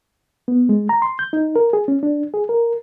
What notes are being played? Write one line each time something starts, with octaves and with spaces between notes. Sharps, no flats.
B3
G#3
A#5
C6
G6
D#4
A#4
G#4
C#4
D4
G#4
A#4